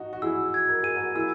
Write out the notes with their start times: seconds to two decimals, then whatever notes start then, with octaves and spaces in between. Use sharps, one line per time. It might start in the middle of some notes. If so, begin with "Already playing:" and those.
Already playing: D#4 F#4
0.13 F#4
0.22 E4 G#4 E6
0.54 G#6
0.69 A#4
0.83 G#4 D#7
0.96 F#4 A#4
1.15 E4 G#4 E6